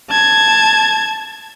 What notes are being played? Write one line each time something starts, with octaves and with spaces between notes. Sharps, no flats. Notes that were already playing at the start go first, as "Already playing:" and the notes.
A5 G#6